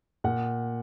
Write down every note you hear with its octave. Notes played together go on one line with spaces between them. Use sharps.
A#2 F#5